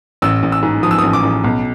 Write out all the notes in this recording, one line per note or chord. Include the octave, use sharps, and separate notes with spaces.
A1 E6
A1
E6
G#2
F3 D#6
E6
A1 D#6
D6
A1
B1